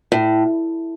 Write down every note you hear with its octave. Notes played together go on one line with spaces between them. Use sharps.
A2